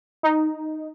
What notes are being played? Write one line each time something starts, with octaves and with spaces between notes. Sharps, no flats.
D#4